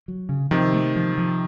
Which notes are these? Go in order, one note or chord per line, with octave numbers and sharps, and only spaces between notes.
F#3
C#3
C3 D#3 F3
A3
F3
F3